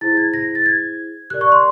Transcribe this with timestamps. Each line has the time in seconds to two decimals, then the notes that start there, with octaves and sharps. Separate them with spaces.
0.01 E4 G#4 C5 A6
0.17 G#6
0.34 A#6
0.55 A6
0.66 G#6
1.30 G4 A#4 D5 F#6
1.41 C#6
1.52 C6